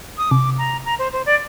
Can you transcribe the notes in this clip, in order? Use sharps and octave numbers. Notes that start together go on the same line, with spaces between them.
D#6
C3 D6
A#5
A#5
C5
C5
D5